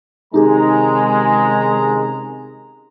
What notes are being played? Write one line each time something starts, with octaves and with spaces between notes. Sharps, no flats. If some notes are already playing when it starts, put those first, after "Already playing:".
C3 D#3 G#3 C#4 D#4 G4 G#4 A#5